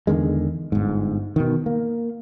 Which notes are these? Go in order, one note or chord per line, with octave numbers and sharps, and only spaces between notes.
E2 D3 D#3 G#3
G1 G#2
B2 D#3
A#3